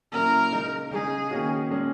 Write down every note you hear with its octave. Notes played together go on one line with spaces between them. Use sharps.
A#2 F#3 C#4 E4 A#4
C#3 G#3 D#4 G#4
C#3 G#3 D#4 G#4
D#3 A#3 C#4 F#4
A#2 G#3 C#4 G#4